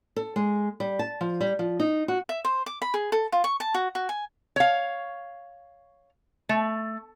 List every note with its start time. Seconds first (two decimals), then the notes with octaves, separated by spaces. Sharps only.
0.16 A4
0.36 G#3
0.80 G3
0.99 A5
1.21 F3
1.41 G3
1.59 F3
1.80 D#4
2.08 F#4
2.29 E5
2.45 C5
2.66 D6
2.82 B5
2.94 G#4
3.12 A4
3.32 F4
3.44 C#6
3.60 A5
3.74 F#4
3.95 F#4
4.09 G#5
4.56 C#5 F5
6.49 A3